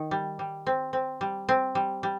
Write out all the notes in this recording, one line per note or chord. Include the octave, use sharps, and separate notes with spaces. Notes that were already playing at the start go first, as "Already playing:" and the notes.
Already playing: D#3
G3
G3
C4
C4
G3
C4
G3
G3